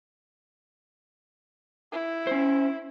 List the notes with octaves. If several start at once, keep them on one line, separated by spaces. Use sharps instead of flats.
E4
C#4 C5